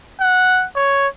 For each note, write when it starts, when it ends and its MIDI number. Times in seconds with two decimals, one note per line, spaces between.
0.21 0.66 78
0.76 1.07 73